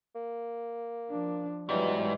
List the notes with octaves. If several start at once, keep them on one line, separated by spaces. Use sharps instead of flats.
A#3
F3 D4
G#2 B2 E3 F#3 G3